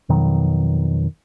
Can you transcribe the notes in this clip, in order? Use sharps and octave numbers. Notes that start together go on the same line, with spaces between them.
F2 B2 D#3 F#3